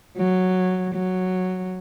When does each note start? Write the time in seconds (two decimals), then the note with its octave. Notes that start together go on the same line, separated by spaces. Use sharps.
0.17 F#3
0.95 F#3